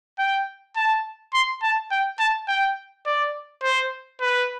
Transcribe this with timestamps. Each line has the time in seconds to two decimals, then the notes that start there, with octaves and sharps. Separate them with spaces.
0.18 G5
0.76 A5
1.33 C6
1.62 A5
1.91 G5
2.19 A5
2.48 G5
3.06 D5
3.63 C5
4.21 B4